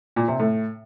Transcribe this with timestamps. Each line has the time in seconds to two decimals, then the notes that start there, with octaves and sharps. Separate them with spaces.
0.16 A#2
0.28 C3
0.40 A2